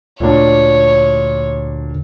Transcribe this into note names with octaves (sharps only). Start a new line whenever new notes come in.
D2 A#2 D4 C#5